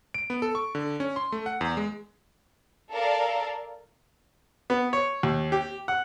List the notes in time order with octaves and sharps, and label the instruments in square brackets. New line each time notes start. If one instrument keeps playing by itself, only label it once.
[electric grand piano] D7
B3
A4
C#6
D3
C#4
C6
A3
F#5
E2
G#3
[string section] A4 A#4 D5 F5
[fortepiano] B3
C#5
D#2
G4
F#5